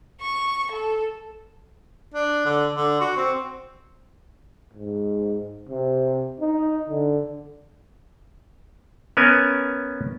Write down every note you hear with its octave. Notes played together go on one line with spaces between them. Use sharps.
C#6
A4
D4
D3
D3
F#4
C4
G#2
C3
D#4
D3
B3 C#4 A#4 G#5